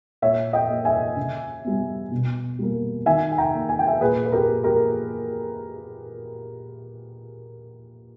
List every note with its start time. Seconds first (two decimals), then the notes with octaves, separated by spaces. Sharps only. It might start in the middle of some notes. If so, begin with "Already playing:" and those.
0.22 A#2 C#5 E5
0.53 D#5 G5
0.69 A#3
0.85 E5 G#5
1.17 C#3
1.65 G3 B3
2.11 B2
2.59 G3 A#3
3.06 D#3 E5 G#5
3.32 G#5
3.38 G5 A#5
3.54 A#3
3.69 G#5
3.79 G5
3.87 E5 G#5
4.01 A#2 G#4 B4
4.26 B4
4.32 G4 A#4
4.48 A#3
4.64 G4 A#4